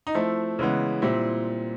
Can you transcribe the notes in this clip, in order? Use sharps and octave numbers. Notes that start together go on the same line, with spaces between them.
D#4
F3 A3 C4 E4
C#3 E3 G#3 B3
A#2 G3 C4 E4